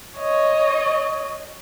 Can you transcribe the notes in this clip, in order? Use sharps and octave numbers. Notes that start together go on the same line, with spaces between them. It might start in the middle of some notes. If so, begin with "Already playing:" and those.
C#5 D#5